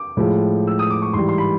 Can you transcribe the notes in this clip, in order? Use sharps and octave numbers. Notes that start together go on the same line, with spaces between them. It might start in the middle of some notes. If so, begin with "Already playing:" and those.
Already playing: D6
A2 F3 G#3
E6
D#6
D6
C#6
G#2 E3 G3 C6
C6
B5